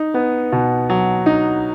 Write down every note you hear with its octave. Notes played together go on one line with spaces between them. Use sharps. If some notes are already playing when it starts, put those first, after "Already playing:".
Already playing: D#4
B3
B2
F#3
D#4